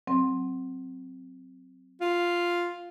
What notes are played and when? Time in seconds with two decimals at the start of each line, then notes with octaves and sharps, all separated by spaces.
0.07 F#3 C4
2.01 F4